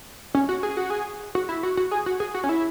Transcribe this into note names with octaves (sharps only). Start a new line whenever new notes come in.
C#4
F#4
G#4
F#4
G#4
F#4
E4
F#4
F#4
G#4
F#4
G#4
F#4
C#4
E4